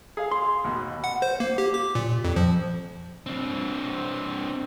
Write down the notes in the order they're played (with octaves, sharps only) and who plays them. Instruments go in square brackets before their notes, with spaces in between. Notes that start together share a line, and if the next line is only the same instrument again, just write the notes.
[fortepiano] G#4 F5
[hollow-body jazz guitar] C6
[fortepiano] D#2 B2
[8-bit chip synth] F#5
C5
A#3
G4
D6
A#2
F2
F3
[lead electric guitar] C4 D4